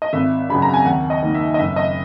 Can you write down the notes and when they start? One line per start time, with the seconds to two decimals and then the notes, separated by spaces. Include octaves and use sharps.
0.02 D#5
0.13 G#1 E5
0.49 F#2 C#3 F#3 B5
0.62 A#5
0.74 G#5
0.86 D#2 F#5
1.10 D#5
1.23 D#3 A#3
1.34 E5
1.54 D#5
1.58 F#1 E5
1.76 D#5